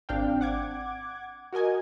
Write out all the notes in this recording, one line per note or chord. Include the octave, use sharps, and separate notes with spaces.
G#1 C4 D4 F5 G5
F#5 D6 G#6
F#4 A#4 D#5 G#5